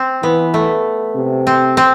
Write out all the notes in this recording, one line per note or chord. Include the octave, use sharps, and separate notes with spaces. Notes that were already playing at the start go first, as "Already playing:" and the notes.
Already playing: C4
E3 B3
A3
C3
C4
C4